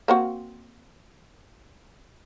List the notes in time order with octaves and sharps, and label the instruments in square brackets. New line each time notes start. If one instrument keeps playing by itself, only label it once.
[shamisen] A#3 C4 F#4